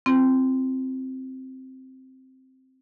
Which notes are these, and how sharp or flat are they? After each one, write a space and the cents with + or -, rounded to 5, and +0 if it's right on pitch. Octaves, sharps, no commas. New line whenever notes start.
C4 +0 F4 -40